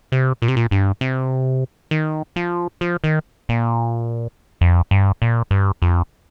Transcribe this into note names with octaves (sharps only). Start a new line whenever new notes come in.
C3
A#2
C3
A#2
G2
C3
D#3
F3
F3
D#3
A#2
F2
G2
A#2
G2
F2